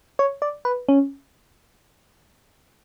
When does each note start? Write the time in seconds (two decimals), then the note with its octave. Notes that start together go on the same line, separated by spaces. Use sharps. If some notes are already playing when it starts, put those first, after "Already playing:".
0.19 C#5
0.42 D5
0.65 B4
0.89 C#4